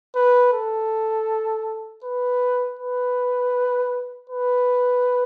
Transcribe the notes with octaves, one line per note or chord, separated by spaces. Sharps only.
B4
A4
B4
B4
B4